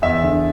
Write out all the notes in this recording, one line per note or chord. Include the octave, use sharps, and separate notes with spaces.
E2 E5
D3